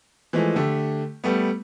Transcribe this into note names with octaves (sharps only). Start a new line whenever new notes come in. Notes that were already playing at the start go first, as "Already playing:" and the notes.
E3 F3 G#3 A3
D3 A3 G4
G3 A3 B3